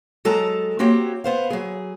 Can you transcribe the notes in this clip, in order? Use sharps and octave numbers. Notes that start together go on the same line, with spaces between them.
F#3 G#3 A4 A5 A#5
A#3 C4 F#4 G4 C#5
B3 C5 F5
F#3 G#4